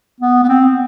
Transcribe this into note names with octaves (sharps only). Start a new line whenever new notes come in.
B3
B3
C4